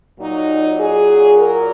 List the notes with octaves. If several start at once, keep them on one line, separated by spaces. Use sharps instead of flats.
A#2 F#3 D#4
G#4
A#4